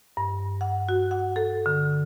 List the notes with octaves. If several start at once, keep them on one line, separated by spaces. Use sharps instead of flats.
G2
F#5
F#4
F#5
A4
D3